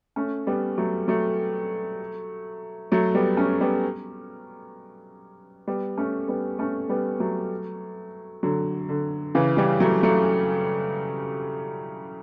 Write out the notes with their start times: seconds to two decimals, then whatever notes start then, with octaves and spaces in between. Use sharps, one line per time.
0.16 A3 C#4
0.47 G3 B3
0.78 F#3 A3
1.08 F#3 A3
2.92 F#3 A3
3.15 G3 B3
3.37 A3 C#4
3.61 G3 B3
5.68 G3 B3
5.98 A3 C#4
6.28 G3 B3
6.59 A3 C#4
6.89 G3 B3
7.20 F#3 A3
8.43 D3 F#3
8.89 D3
9.35 C#3 E3
9.57 E3 G3
9.80 F#3 A3
10.03 F#3 A3